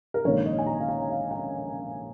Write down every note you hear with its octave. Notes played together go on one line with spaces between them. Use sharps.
A#4
A#1 G#2 D#3 A#3 C#5
D#5
G#5
A#5
F5
G#5
F5
G#5